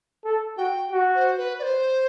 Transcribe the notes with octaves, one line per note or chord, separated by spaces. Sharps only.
A4
F#4 G5
F#4
C5
B4
D5
C5